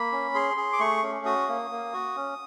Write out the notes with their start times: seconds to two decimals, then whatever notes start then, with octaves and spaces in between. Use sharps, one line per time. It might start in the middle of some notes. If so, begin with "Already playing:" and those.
Already playing: A#3 B5
0.12 C#4
0.35 G#4 C6
0.57 G#4
0.73 D6
0.80 A3 C#6
1.03 C#4
1.25 F#4 D#6
1.48 A#3
1.71 A#3
1.93 F#4
2.16 C#4